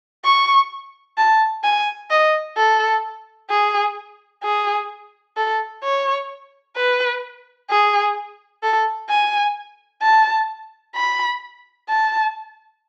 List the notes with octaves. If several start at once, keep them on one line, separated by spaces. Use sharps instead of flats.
C#6
A5
G#5
D#5
A4
G#4
G#4
A4
C#5
B4
G#4
A4
G#5
A5
B5
A5